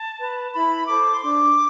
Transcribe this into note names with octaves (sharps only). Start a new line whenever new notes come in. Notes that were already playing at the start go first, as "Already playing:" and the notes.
Already playing: A5
B4
E4 B5
A4 C5 D6
C6
D4 D6